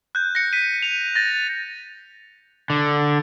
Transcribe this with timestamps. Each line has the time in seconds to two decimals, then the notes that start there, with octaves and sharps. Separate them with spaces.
0.15 F#6 G6
0.35 A#6 C#7
0.53 B6 D#7
0.82 D#7 F7
1.15 A6 A#6
2.70 D3